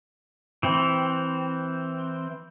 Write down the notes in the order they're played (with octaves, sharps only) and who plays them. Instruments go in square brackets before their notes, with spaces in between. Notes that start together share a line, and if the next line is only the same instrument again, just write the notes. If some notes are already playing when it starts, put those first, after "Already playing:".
[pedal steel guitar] E3 C4